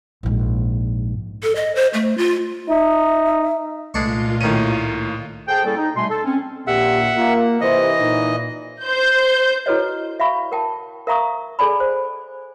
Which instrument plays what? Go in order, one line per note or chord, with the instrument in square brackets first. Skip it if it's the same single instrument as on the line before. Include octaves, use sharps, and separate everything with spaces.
[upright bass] A#1 G#2
[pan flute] A4
D#5
C5
A3
F4
[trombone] D#4 [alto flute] E5
[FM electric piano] C2 A3 C7 [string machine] A#2 F4 [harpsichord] G#3 D4 C#6
[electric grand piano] A2 D#7 [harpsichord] D#3 C#4
[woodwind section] G#4 A4 C5 G5
G3 A#3 C#4 E4 G#4 A4
D#4
B2 G3 A3 G#5 C6
A4
C4 C#4
[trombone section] A#1 D#2 A#2 [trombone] G4 [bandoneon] E5 F#5
[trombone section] A#3 [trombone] F4
[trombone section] C3 [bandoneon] E3 D#5 [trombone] C5
[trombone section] A#2 [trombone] D#4
[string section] C5 G6
[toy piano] E4 F#4 A4 B4 C#5 D#5
E5 F5 B5 C#6
A#4 G5 A5
A#4 E5 F5 A#5 C#6 D#6
G#4 A4 D5 G#5 B5
C5